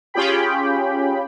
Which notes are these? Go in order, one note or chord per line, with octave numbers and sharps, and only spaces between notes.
C#4 F4 G4 G#4 G5 B5